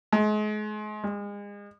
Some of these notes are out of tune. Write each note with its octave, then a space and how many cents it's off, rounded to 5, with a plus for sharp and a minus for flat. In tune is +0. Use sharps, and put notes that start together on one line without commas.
G#3 +35
G#3 -35